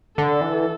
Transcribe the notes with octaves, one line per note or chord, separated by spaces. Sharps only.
D3 A4
E3